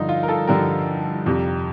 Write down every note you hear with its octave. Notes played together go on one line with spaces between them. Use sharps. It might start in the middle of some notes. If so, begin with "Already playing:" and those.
Already playing: G2 D3 F3 D#4
F4
A#4
F4 A4
G2 D3 F3 G4 A#4
F2 C3 G3